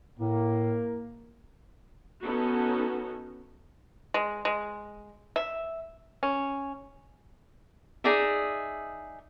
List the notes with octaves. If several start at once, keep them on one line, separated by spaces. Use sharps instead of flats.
A2 A#3
B3 C#4 D#4 F#4 A4
G#3
G#3
E5
C#4
D#4 G#4 D5 E5